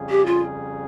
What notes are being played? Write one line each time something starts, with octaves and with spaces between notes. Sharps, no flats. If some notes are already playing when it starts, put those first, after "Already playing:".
Already playing: F2 C#3 G3 C#4 G#4
G4
F4